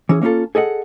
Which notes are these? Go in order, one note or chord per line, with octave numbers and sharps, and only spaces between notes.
E3 C#4 G#4
A#3 C#4 D#4 F4 A4
G#4 A4 D#5 F#5